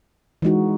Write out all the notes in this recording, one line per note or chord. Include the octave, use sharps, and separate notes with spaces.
E3 G#3 D#4 F#4